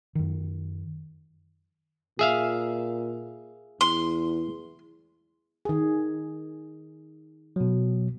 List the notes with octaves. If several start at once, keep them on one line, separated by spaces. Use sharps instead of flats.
F#2 D#3
A#2 G#4 E5 F5
E2 C6
D#3 G#4
B2 F#3